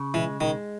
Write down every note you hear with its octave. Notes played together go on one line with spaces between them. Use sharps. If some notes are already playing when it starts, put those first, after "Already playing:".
Already playing: C#3
E3 G#3
D#3 G#3